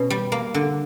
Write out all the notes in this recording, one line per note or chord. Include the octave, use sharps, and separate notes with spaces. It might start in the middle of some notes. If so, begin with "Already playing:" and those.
Already playing: B2 C#4
G3
A#3
D3